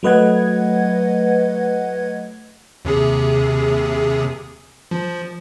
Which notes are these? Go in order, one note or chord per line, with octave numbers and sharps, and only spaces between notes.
F#3 A3 B4 D#5 F#5 G#6
D#2 C3 G#4
F3